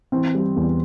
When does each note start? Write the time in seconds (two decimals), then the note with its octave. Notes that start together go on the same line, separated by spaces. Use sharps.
0.12 E3 C4
0.35 G3
0.56 E2